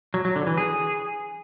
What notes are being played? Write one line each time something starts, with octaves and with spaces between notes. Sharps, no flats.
F#3
F#3
D3
E3
G#4